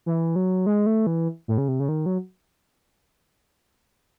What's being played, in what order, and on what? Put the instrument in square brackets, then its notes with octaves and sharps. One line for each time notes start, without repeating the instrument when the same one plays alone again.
[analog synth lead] E3
F#3
G#3
A3
E3
A2
C#3
C3
C#3
D#3
F#3